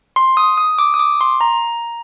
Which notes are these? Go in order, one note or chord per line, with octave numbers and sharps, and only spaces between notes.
C6
D#6
D#6
D6
D#6
D6
C6
A#5